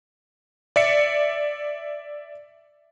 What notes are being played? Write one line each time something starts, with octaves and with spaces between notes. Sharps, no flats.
D5 E5 C#7